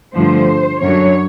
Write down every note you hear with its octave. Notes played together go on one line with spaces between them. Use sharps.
G2 D3 F3 A3 C5
F#2 D3 F#3 C#5